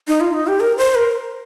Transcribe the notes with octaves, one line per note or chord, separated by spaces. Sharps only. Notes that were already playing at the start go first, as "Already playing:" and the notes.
D#4
F4
D#4
G4
A#4
C5
A#4